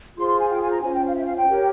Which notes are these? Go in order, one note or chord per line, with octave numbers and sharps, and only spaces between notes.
F4 G#4 C5 C6
C6
G#5
G5
G#5
A#5
C#4 F4 C5 G#5
G5
F5
E5
F5
G5
G4 A#4 C#5